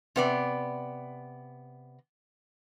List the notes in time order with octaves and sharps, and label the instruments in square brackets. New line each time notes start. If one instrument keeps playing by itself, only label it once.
[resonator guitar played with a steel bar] C3 B3 D5